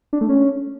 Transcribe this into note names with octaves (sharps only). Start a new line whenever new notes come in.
D4
A3
C#4